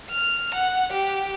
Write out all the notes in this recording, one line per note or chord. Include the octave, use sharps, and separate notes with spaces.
F6
F#5
G4